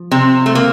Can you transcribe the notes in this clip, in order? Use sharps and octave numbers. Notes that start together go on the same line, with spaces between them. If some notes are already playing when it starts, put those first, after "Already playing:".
Already playing: F3
C3 C4
A3
A#3